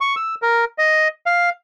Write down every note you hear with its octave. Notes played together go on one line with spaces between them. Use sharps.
C#6
E6
A#4
D#5
F5